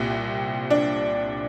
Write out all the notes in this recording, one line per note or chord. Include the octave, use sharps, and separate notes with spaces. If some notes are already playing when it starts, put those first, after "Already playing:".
Already playing: C2 A#2 C4
D4